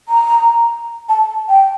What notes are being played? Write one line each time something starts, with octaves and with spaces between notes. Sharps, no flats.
A#5
A5
G5